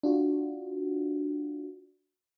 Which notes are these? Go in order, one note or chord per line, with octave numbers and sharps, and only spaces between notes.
D4 F4 F#4